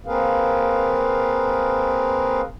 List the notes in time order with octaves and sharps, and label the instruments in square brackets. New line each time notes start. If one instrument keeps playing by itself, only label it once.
[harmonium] A#3 C4 G#4 A#4 B4 F5